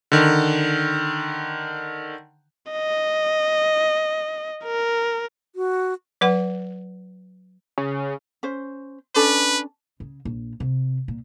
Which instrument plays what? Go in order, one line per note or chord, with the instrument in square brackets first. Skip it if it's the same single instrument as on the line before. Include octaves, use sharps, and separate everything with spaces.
[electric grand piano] D3 D#3
[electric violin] D#5
A#4
[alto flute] F#4
[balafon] F#3 B4 F#5
[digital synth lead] C#3
[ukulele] C#4 C5
[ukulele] C#4 D4 A4 [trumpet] B4
[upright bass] C#3
A#1
C3
A#2